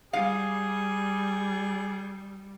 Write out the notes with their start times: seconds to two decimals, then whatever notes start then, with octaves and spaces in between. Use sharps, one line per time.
0.13 G3 G#4 F5 D#6